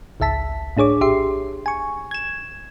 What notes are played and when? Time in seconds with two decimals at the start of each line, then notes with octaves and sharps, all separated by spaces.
0.20 G#1 C#2 E5 A5 B6
0.77 A2 D4 G#4 C#5 D6
1.01 A#1 G4 E5 C6 C7
1.66 G#5 C#6
2.11 G#6 E7